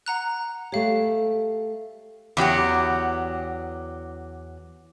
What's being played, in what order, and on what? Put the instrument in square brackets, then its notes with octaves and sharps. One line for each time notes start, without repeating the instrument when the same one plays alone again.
[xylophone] F#5 A#5 F#6
[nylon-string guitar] A3 G4 [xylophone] C#5 F5
[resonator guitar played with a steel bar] E2 F#3 G4 F#5